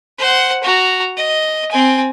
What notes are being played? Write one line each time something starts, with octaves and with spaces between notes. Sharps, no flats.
C5 F#5
F#4 A#5
D#5
C4 G#5